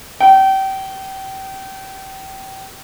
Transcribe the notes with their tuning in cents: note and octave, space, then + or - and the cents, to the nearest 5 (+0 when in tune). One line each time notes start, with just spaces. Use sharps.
G5 -30